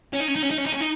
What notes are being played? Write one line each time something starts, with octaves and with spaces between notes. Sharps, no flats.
C#4
D#4
C#4
D#4
C#4
D#4
C#4
D#4
C#4
D#4